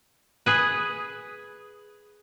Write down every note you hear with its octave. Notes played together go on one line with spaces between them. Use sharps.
G#4 B4